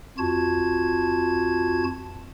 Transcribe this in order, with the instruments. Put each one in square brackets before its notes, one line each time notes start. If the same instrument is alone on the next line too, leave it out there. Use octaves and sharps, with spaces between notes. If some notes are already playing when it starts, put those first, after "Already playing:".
[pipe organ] F2 F4 F#4 A5 G#6